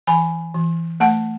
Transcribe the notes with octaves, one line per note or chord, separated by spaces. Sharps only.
E3 G#5 B5
E3
A3 F#5 A5